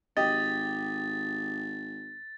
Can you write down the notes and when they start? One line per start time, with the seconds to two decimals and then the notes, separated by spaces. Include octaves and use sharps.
0.17 G#1 G4 D#5 A6